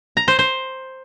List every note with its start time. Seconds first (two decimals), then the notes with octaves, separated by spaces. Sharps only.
0.17 A#5
0.28 C5
0.39 C5